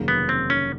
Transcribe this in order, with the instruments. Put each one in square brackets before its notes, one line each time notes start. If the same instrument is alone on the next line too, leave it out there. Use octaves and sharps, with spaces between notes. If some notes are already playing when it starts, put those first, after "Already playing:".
Already playing: [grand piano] F1 D#2 C#3 F#3 A#3
[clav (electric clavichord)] B3
C4
C#4